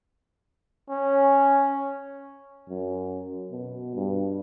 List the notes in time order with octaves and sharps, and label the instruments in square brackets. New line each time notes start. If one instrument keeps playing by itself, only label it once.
[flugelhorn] C#4
[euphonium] F#2
B2
G2